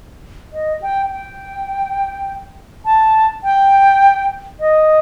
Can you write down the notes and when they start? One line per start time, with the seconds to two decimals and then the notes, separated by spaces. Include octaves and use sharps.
0.53 D#5
0.82 G5
1.11 G5
2.85 A5
3.44 G5
4.60 D#5